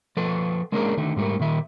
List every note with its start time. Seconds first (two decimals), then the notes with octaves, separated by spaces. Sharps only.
0.17 F3 A4 B4
0.72 G#3 A#3 C#4 D4 G#4 A#4
0.97 D3 D#3 A3
1.16 G#2 G3 A3 A#4
1.40 A#2 D#3 E5